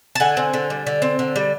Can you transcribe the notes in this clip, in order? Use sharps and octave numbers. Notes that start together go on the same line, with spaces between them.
A5
D3 F#5 G#5
C4
D3
G3
D3
C4
D3
G3